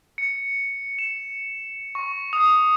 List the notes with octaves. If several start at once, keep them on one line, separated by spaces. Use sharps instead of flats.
C#7
E7
C#6
D#6